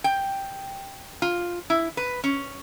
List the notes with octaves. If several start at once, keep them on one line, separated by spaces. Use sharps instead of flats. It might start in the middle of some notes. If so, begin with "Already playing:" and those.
G5
F4
E4
B4
C#4